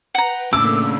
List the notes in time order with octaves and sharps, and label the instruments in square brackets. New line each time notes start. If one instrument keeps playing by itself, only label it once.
[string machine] B4 G5 [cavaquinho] F#5 A#5
[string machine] A2 A3 A#3 [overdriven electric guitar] C#3 D4 [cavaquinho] D6 [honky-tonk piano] E6